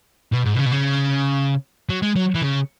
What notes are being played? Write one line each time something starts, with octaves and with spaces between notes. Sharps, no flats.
B2
G#2
B2
C#3
B2
C#3
F#3
G#3
F#3
E3
C#3